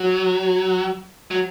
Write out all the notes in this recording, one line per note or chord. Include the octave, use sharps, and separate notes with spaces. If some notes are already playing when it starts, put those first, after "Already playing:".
Already playing: F#3
F#3